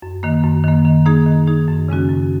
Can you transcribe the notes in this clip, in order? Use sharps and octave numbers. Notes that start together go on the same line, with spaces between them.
F#2
D#3 A#3
F#2
D#3 A#3
D#3
A#3 D#4 G#4
D#3
A#3 D#4 G#4
F#2
C#3 G#3 C#4 F#4
F#2